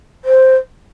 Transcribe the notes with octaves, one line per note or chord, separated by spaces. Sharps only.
C5